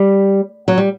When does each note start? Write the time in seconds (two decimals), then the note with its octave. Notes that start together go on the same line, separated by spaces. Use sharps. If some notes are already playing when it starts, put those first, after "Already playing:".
Already playing: G3
0.68 F#3
0.78 G3